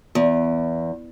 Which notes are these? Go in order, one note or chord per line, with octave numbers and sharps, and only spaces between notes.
E2